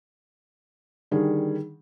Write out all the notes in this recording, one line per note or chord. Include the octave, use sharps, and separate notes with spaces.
D3 D#3 G3 G#4